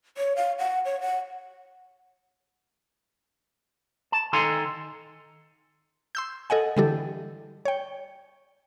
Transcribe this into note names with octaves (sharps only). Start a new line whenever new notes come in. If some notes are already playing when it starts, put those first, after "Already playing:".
C#5
F5
F#5
C#5
F#5
A5
D#3 A4 G#5 A#5 C6
C6 E6 G6
A4 D#5 F#5 G#5
D3 E3 G3 E4 G4 A4
C#5 G5